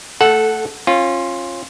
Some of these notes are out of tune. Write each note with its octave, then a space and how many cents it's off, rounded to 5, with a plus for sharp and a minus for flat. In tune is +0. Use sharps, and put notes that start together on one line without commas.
A3 +5 A4 -10 F#5 +0
C#4 -30 F4 +0